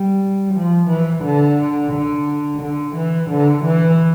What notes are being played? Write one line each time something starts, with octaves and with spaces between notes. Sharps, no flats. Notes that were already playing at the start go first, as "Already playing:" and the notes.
Already playing: G3
F3
E3
D3
D3
D3
E3
D3
E3